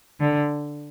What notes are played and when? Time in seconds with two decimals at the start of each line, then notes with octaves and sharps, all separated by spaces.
0.20 D3